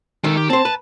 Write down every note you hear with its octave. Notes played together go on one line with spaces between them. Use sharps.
D#3 G#3 A4
G4
C4 C5 A5
B4